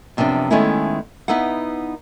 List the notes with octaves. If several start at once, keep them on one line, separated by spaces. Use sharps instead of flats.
F#2 C3 F3 B3 D4
D#3 G#3 A3 B3 C#4 E4
B3 D#4 E4 B4 F#5